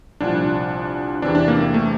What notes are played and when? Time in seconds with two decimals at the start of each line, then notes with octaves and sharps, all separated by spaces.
0.20 C2 A#2 F3 D4
1.22 E2 C3 E3 D4
1.35 D4
1.48 A#3
1.60 A#3
1.74 A3